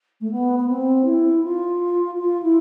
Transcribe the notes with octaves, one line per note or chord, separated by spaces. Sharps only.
A3
B3
B3
C4
E4
F4
F4
E4